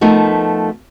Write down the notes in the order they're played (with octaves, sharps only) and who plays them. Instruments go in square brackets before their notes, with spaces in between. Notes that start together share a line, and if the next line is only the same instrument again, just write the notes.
[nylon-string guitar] F3 A3 B3 D#4 A#4